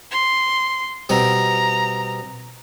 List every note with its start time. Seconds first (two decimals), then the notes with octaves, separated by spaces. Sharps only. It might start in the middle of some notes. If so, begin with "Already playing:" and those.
0.11 C6
1.09 B2 G3 C4 A#5